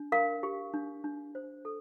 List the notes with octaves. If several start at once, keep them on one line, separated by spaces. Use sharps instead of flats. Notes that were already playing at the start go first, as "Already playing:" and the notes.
Already playing: D4
A#4 F5
G4
D4
D4
C5
A4